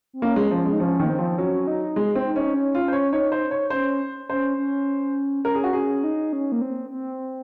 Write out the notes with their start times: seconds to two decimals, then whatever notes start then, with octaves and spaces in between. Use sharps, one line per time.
0.13 C4
0.22 A#3 C#4
0.36 G#3
0.51 F3 C#4
0.66 G#3
0.73 D#4
0.80 F3 C#4
0.99 D#3
1.04 A#3
1.09 C4
1.18 F3
1.38 F#3 C#4
1.67 D#4
1.96 G#3
2.15 C4
2.26 D#4
2.36 C#4
2.55 C#4
2.75 F4
2.84 C#4 C5
2.93 C#5
3.13 D#4 C#5
3.32 C5
3.51 C#5
3.70 C#4 C5
4.29 C#4 C5
4.58 C#4
5.45 C#4 A#4
5.54 G#4
5.64 F#4
5.73 C#4 G#4
6.04 D#4
6.33 C#4
6.52 A#3
6.62 C4
6.90 C4